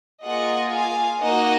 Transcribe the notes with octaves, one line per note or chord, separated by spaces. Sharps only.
A#3 F4 G#4 D#5 F#5
F5 G#5
A#3 D#4 F#4 D#5 F#5